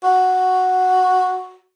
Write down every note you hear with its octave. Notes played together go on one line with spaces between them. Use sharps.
F#4